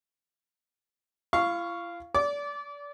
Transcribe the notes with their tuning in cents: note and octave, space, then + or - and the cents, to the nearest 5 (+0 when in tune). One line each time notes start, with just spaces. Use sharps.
E4 +45 F5 -10 C#6 +0
D5 -30 D6 -15